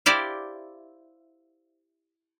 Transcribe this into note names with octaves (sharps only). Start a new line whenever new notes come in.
E4 G4 C5 D5 F5